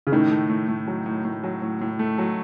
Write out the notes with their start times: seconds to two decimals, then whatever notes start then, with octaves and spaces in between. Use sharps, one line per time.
0.07 C#3
0.12 A2 D#3
0.31 A3
0.49 A2
0.68 A2
0.87 F#3
1.06 A2
1.25 A2
1.44 F#3
1.62 A2
1.81 A2
1.99 A3
2.18 F#3